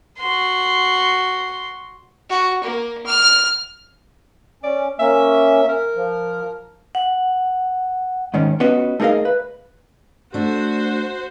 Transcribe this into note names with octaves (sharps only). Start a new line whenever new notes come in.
F#4 C6
F#4
A#3
F6
C#4 D5
A#3 C#4 E5
A#4
F3
F#5
G#2 D#3 C#4
B3 C#4 F4 F#4 B4 D#5
A3 D#4 G#4 A#4 D#5 F5
B4
A3 D4 F#4 C5